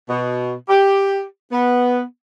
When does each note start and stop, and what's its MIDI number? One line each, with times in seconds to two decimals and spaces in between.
0.09 0.53 47
0.69 1.24 67
1.52 2.02 59